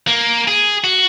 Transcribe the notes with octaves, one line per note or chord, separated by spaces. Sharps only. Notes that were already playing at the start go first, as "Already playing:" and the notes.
A#3
G#4
F#4